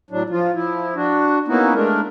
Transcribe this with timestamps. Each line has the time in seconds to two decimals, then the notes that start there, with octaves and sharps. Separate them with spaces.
0.11 A2 F#3 D4
0.30 F3 F4
0.54 F3 E4
0.95 D4 F#4
1.48 A#3 B3 C#4 D#4 E4 F#4
1.74 G#3 A3 D4 A#4